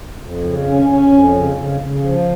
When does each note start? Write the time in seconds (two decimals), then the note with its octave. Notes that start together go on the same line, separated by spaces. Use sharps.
0.21 F2
0.44 C#3
0.67 C#4
0.89 C#4
1.12 F2
1.34 C#3
1.57 C#3
1.81 C#3
2.03 F3